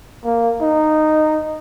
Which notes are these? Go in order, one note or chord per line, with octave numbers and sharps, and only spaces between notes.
A#3
D#4